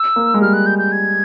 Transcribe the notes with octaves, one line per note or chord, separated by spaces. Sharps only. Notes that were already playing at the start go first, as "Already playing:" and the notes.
Already playing: E6
A#3
G#3
G3 F6
F#6
G6
G6
G#6